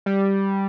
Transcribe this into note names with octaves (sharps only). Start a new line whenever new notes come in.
G3